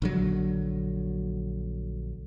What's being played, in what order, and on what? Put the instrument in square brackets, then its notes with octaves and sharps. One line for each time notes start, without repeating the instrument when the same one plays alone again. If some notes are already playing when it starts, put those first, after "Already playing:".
[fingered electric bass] A#1 D3 F#3